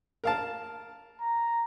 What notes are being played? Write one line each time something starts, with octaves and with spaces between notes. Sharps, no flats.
A#4 F5 A5
A#5